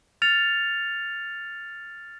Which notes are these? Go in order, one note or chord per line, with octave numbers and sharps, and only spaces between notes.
F6 A6 C#7 F7